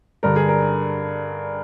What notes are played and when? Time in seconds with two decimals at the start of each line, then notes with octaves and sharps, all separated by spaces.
0.23 G2 D3 G3 A#4
0.36 G#4
0.49 A#4